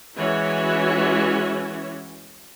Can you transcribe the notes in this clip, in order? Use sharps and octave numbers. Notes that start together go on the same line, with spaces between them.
E3 G#3 C#4 E4 F#4 C#5